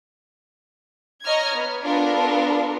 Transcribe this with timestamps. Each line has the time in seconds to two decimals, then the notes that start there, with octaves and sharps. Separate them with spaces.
1.24 C#5 D#5 A#5 F6 G#6
1.54 B3
1.84 B3 D4 F4 A4 A#4